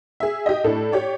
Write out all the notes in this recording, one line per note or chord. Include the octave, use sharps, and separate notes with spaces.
G#4 E5
G4 D#5
A2 A3 D4 E4 A4
G4 C#5 D5